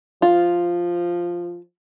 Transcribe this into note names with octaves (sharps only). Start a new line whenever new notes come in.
F3 F4